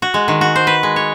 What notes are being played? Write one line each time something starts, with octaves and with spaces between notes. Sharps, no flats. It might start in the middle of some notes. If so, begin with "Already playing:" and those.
F#4
G#3
D#3
F#4
C5
B4
G#3
C#5